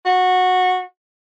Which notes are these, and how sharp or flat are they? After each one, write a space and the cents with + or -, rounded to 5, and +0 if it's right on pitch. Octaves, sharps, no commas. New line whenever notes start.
F#4 -15